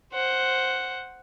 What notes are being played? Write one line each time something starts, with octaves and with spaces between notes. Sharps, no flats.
C5 F#5